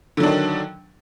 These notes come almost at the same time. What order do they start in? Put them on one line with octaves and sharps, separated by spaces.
D3 F#3 D4 D#3